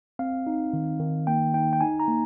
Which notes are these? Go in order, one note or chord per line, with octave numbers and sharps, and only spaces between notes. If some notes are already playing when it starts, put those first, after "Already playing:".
C4 F5
D#4
D#3
D#3
A#3 G5
D#4 G5
G5
D#4 G#5
A#5
A#3